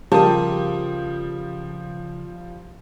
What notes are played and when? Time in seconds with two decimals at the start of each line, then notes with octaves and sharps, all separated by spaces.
0.12 C#3 F3 G3 F4 G4 A#4 A5 D#6